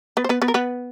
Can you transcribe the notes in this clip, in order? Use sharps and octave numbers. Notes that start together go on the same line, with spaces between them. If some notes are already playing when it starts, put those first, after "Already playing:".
B3 B4
C5
B3 B4
B3 B4
A#4
B3 B4